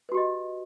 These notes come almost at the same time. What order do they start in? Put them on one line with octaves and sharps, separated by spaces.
B4 F#4 G4 D#5